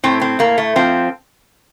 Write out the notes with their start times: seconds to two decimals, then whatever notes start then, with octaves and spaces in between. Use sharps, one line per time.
0.04 A2 C4
0.21 C4
0.39 A2 A#3
0.58 A3
0.76 F3 C4